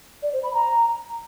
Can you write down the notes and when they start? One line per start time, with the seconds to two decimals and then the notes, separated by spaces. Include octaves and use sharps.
0.22 D5
0.33 C5
0.43 B5
0.53 A#5